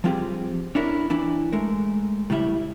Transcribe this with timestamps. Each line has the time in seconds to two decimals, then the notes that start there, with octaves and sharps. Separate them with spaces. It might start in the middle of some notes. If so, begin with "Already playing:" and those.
0.04 F3 G3 C4 F4 G4 G#4
0.75 C#4 D4 E4 A#4
1.10 E3 D4 E4
1.52 G#3 A3 A#4
2.30 A2 C#3 G3 E4 E5